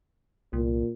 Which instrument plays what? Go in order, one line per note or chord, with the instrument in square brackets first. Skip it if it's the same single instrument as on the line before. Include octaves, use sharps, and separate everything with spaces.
[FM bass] C2 [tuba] A#2